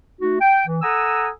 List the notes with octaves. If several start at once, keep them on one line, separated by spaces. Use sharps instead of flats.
A3 D#4 F#4
G5
E3
A4 F#5 G#5 A#5 D#6 E6